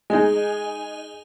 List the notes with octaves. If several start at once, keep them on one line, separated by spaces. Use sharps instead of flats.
G#3 D#4 D#5 G#5